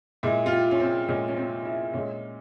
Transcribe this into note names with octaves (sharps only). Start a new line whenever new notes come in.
A#2 G#3 E4
F4
G4
C#4
C4
A#2 G#3 C#4
C#4
C4
E4
A#2 G#3 C#4